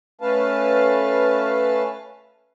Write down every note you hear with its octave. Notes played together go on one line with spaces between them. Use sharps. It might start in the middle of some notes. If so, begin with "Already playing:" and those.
A3 C#4 B4 F5 A5